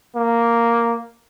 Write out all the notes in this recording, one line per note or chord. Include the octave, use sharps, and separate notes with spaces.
A#3